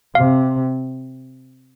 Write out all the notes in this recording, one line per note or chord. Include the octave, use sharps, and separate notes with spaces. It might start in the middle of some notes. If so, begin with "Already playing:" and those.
C3 F5